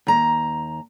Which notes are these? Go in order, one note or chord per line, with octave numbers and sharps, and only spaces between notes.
D#2 A#5